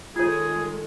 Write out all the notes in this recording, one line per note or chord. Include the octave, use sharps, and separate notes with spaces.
D#3 G#3 F4 G#4 A4 C#5